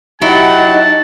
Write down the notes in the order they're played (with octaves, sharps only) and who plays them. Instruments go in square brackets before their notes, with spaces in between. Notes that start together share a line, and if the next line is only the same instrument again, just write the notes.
[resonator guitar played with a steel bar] F#3 E4 [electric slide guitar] D#4 [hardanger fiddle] G4 F#5 [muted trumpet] A5